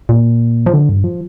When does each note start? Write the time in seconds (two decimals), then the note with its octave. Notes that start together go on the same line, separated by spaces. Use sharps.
0.09 A#2
0.66 F3
0.73 D3
0.89 G2
1.04 F3